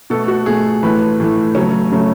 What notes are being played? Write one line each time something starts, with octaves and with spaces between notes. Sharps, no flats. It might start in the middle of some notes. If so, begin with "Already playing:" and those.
B2 A3 A4
F#4
B2 A3 G#4
A2 E3 A3 B4
A2 E3 A3
C#3 F#3 A3 C#4
C#3 F#3 A3